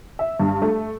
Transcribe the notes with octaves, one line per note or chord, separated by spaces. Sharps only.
E5
G2
A3